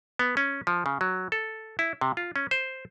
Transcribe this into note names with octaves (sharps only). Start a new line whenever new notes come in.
B3
C#4
F3
C#3
F#3
A4
E4
C3
F4
C#4
C5